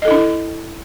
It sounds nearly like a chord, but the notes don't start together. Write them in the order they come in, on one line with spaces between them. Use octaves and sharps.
D#5 A4 E4 D4